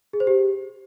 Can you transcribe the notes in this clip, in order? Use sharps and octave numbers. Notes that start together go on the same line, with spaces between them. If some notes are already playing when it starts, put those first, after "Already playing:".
G#4
C5
G4